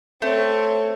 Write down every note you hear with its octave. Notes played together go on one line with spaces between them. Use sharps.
A3 C4 C#5